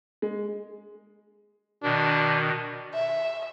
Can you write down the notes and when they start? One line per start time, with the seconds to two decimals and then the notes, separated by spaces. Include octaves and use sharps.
0.22 G#3
1.84 B2 D#3 D4
2.94 E5